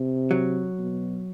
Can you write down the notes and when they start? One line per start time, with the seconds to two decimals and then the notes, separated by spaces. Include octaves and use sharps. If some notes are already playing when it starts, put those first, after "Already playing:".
Already playing: C3
0.31 F#3
0.79 B2